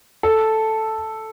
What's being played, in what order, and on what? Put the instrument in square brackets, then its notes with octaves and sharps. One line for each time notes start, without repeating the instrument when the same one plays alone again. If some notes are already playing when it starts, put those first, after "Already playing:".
[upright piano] A4